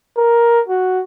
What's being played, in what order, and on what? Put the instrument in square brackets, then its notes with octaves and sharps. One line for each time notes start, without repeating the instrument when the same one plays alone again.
[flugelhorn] A#4
F#4